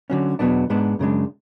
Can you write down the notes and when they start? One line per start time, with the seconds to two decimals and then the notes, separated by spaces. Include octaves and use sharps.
0.10 D3 F#3 C#4
0.39 E2 B2 F#3 B3 D4
0.70 G#2 G#3 B3 D4
0.99 F#2 C#3 G#3 D4